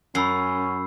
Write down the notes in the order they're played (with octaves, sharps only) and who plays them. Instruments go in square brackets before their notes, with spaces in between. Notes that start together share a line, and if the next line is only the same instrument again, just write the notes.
[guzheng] F#2 [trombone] C#4 [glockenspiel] B5 E6 C7